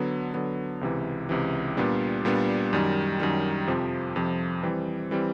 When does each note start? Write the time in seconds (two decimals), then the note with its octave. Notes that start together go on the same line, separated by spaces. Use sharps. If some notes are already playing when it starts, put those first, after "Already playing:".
Already playing: D3 F#3 B3
0.34 D3 F#3 B3
0.81 C#2 C3 E3
1.29 C#2 C3 E3
1.77 A#2 G3 B3 D4
2.25 A#2 G3 B3 D4
2.73 F#2 D#3 G3
3.20 F#2 D#3 G3
3.68 F2 C3 F3
4.16 F2 C3 F3
4.63 E3 G3 C4
5.11 E3 G3 C4